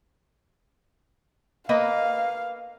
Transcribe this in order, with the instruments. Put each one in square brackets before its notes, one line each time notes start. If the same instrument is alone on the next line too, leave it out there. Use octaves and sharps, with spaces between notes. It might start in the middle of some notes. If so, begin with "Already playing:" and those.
[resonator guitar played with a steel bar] A#3 B4 D#5 [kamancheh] F5